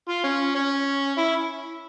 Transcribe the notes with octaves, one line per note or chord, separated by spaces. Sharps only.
F4
C#4
C#4
E4